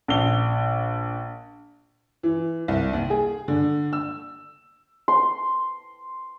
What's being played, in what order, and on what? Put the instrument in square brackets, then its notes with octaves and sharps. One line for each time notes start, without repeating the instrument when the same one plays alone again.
[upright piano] A#1 G7
[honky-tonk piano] E3
C2
D#2
G#4
D3
E6
[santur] C6